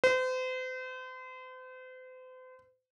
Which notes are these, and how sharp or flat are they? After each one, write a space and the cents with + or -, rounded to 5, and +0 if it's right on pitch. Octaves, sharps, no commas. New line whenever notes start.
C5 -40